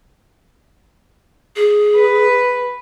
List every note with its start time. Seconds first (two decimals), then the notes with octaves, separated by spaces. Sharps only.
1.56 G#4
1.96 B4